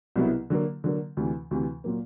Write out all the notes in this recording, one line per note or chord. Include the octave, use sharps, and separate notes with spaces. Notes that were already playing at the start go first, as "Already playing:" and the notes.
C2 B2 F#3 B3 E4
D3 F#3 A#3
D3 F#3 A#3
D2 C3 E3
D2 C3 E3
A#2 F#3 A#3